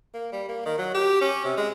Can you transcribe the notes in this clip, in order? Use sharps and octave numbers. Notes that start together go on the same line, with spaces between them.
A#3
G3
A#3
D#3
F#3
G4
C#4
C3
G#3